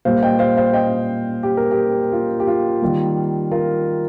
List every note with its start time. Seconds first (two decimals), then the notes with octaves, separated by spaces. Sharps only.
0.05 A#2 G3 A#3 C5 F5
0.23 D#5 G5
0.39 C5 F5
0.57 C5 F5
0.74 D#5 G5
1.43 G4
1.57 A#4
1.71 G4
2.12 F4
2.40 G4
2.47 F4
2.82 D#3 G3 A#3
3.51 F4 A#4